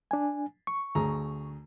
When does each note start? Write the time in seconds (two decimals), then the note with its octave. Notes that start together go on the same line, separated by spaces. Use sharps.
0.11 D4 G#5
0.67 C#6
0.95 D2 G#4 A#5